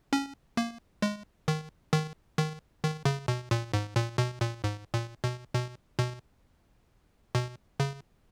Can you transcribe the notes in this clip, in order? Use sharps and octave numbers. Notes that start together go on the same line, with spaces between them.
C#4
A#3
G#3
D#3
D#3
D#3
D#3
C#3
B2
A#2
G#2
A#2
B2
A#2
G#2
A#2
B2
B2
B2
B2
C#3